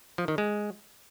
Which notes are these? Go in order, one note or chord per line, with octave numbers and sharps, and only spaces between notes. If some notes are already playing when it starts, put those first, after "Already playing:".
F3
D#3
G#3